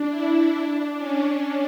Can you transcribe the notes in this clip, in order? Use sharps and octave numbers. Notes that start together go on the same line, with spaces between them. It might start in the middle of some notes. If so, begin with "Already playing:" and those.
Already playing: D4
E4
D4
C#4